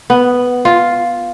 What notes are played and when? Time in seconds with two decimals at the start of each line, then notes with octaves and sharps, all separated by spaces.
0.10 B3
0.65 F4